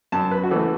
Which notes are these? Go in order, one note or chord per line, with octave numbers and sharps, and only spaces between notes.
F#2 A5
B4
F#4
E3 A3 A4